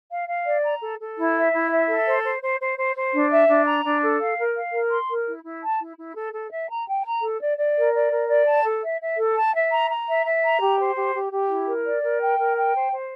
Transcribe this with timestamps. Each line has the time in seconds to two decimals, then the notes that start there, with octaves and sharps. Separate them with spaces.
0.11 F5
0.28 F5
0.45 D5
0.64 A#5
0.81 A4
0.99 A4
1.17 E4
1.35 E5
1.52 E4
1.70 E5
1.88 A4
2.06 C5
2.24 C5
2.41 C5
2.60 C5
2.76 C5
2.95 C5
3.12 D4
3.30 E5
3.48 D4
3.66 A#5
3.84 D4
4.02 A4
4.20 F5
4.37 A#4
4.55 F5
4.73 A#4
4.91 C6
5.09 A#4
5.27 E4
5.43 E4
5.61 A5
5.80 E4
5.97 E4
6.15 A4
6.33 A4
6.50 E5
6.69 A#5
6.86 G5
7.04 A#5
7.22 A4
7.40 D5
7.57 D5
7.76 A#4
7.93 D5
8.11 A#4
8.29 D5
8.46 A5
8.65 A4
8.82 E5
9.00 E5
9.17 A4
9.35 A5
9.54 E5
9.72 A#5
9.89 A#5
10.07 E5
10.25 E5
10.42 A#5
10.60 G4
10.78 C5
10.95 G4
11.14 G4
11.31 G4
11.49 E4
11.67 A#4
11.84 D5
12.02 A#4
12.20 G5
12.38 A#4
12.56 G5
12.74 C5
12.92 C5